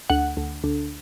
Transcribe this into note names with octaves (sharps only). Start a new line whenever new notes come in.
D2 F#5
D2
D2